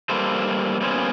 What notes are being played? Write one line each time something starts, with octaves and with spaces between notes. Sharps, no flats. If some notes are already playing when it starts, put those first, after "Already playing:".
G3 A#3 A4 B4 C5
G3 A#3 B3 C#4 C5